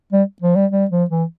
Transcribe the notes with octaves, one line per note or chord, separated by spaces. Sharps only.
G3
F3
G3
G3
F3
E3